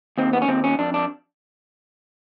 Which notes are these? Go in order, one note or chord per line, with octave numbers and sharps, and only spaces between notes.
D#2 C4
B3
C#4
D#2 C4
C#4
F2 D4
D4